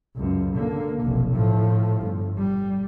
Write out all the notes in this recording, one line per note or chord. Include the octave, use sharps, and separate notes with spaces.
C#2 F#2
D3 A#3
F1 B1
A2 F3
G1
G3